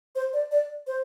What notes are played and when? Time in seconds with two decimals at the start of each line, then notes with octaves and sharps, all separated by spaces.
0.15 C5
0.33 D5
0.51 D5
0.87 C5